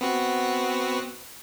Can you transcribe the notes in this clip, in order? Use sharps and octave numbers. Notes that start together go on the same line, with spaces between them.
B3 C4 F#4